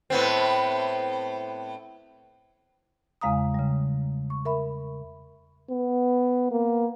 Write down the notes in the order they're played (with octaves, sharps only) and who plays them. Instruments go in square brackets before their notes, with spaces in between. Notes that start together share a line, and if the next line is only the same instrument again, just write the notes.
[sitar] A2 B3 C4
[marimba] E2 C#3 G#3 F5 A#5 D#6
C#3 G3
C#6
A#4 E5 B5
[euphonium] B3
A#3